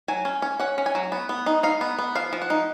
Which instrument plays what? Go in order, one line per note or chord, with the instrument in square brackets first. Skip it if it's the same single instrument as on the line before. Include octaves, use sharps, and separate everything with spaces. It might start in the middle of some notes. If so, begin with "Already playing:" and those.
[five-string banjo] F#3 G#5
C#4
C#4
C#4 F#5
C#4
G#5
F#3
B3
B3
D#4
D#4 F5
B3
B3
F3 F5
F3
F#5
D#4